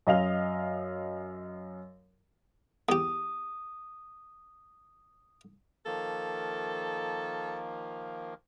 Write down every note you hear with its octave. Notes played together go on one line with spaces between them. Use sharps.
F#2 D#5 F5 F7
E2 G4 D#6
D#3 F3 A#3 A4